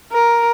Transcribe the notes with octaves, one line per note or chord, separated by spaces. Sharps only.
A#4